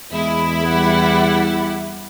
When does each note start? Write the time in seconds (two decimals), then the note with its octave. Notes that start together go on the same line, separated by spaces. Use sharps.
0.12 E2 G#3 E4
0.67 G3 F#5